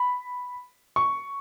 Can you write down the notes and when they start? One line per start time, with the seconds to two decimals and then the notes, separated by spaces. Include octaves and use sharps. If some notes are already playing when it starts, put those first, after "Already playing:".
Already playing: B5
0.96 C#6